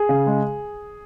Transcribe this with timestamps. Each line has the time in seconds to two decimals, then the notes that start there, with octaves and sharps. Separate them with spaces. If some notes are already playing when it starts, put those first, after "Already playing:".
Already playing: G#4
0.09 C#3
0.27 G#3